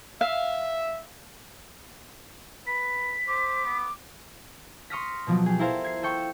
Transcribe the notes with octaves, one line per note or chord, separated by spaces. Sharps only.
E5 F5
B4 B6
C5 D6
B3
C6 C#6 D#6 F6 A#6 B6
B2 F3 F#3
G4 G#4
E4 A4 A#4 C5 F5
G#6 C7
A4 E5 G5 C#6